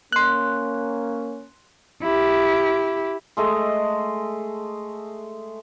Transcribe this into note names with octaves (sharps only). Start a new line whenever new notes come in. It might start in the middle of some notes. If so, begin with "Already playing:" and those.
A#3 C#4 C6 F#6
E4 G4
G#3 A3 A4 D#5